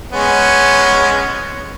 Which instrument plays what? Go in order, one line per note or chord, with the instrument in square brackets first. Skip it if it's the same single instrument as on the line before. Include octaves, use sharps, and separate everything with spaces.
[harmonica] G#3 B3 C#4